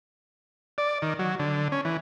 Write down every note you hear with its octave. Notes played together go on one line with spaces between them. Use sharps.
D5
D#3
F#3
D3
C#4
E3